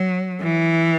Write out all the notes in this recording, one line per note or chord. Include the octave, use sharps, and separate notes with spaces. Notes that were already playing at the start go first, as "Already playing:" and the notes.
Already playing: F#3
E3